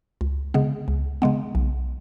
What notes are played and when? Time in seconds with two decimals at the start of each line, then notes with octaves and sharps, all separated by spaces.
0.21 C#2
0.54 C#3 G#3 B3
0.88 C#2
1.22 C#3 G#3 B3
1.55 B1